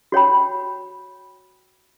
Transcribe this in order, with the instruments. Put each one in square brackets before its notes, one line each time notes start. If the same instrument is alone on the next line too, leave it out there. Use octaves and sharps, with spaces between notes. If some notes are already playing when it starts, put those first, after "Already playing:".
[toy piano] F#4 C#5 G5 B5